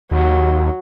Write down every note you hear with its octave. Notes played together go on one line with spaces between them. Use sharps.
D#2 F#3